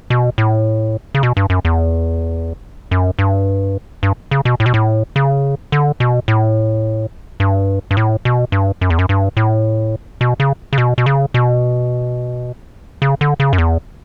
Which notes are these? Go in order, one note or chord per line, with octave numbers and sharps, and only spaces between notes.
B2
A2
C#3
B2
G2
F#2
E2
F#2
G2
G2
C#3
B2
A2
B2
A2
C#3
D3
B2
A2
G2
G2
A2
B2
G2
F#2
E2
F#2
G2
A2
B2
C#3
C#3
B2
B2
C#3
B2
C#3
D3
C#3
F#2
E2